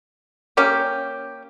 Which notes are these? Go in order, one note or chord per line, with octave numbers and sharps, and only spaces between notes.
A#3 C#4 G4